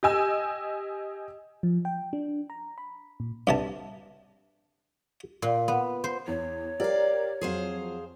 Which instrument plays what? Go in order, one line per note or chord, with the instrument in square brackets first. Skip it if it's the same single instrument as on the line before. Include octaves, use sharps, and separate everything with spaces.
[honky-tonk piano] G4 D#5 G#5 E6
[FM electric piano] F3
G5
D4
A#5
B5
A#2
[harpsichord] G2 C3 A5
[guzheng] A#2
B3
C5
[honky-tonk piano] E2 [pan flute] C#5
[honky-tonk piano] G4 A#4 [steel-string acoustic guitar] D5 F5
[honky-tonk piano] F2 F#3 [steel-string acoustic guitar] G#4 C5 F5